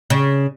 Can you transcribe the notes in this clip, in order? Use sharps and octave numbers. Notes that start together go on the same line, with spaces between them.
C#3